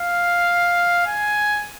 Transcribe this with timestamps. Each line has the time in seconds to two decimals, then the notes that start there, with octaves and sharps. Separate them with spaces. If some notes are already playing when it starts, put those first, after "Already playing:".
Already playing: F5
1.07 G#5